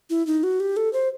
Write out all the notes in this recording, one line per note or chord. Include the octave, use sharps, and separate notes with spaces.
E4
D#4
F#4
G4
A4
C5